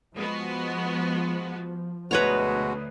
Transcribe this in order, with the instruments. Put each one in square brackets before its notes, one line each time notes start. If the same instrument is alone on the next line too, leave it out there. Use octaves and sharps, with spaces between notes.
[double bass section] F3 [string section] G#3 B3 F#4
[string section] D2 [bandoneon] B2 G#3 F#4 [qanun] B4 C#5 A#5